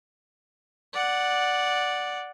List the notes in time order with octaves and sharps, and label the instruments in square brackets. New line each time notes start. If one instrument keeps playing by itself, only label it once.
[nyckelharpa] D5 F#5